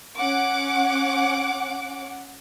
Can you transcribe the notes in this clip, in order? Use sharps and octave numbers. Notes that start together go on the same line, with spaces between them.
C#4 F#5 D6